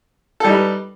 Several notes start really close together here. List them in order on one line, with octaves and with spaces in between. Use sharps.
A4 G3 D#4 B4